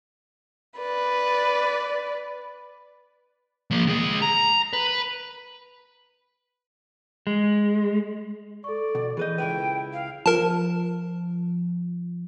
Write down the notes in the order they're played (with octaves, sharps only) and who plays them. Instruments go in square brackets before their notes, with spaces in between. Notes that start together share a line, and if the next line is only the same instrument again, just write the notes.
[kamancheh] B4 D5
[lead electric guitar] F3 A#3
C#2 G#4
A#5
B4
[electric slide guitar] G#3
[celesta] A4 C#6 [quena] D5
[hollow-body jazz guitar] B2
[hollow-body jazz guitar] E3 B4 D#5 [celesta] G#4 G6
[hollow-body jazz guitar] C#2 E4 B4 [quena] G5
[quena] F5
[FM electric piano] F3 [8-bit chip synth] A#4 A5